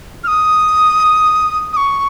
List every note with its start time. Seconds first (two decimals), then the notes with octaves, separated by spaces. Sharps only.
0.24 F6
0.27 D#6
1.73 D#6
1.77 C#6